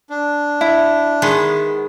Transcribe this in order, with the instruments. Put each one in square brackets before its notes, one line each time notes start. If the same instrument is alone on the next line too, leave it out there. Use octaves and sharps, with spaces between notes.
[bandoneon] D4
[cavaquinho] E4
[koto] D#3 G#3 B3